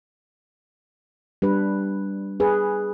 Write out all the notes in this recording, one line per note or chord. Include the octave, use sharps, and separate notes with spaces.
G3 D4 B4
G#4 B4